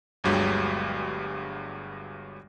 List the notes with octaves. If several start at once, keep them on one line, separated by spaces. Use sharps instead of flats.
G1 D2 G2 F#3 G#3 G4